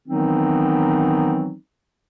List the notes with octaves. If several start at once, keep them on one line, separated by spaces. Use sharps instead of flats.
D#3 E3 F#3 B3 C4 D#4